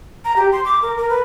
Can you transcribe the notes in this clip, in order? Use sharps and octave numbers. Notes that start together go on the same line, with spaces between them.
A#5
G4
C6
D6
A#4
A#4
B4